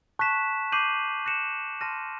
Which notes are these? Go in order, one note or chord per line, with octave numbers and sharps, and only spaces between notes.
A5 C#6 F#6 B6 E7
D6 G6 C7 D#7 F#7
F#6 A#6 C#7 E7
A5 C6 F6 A#6 D#7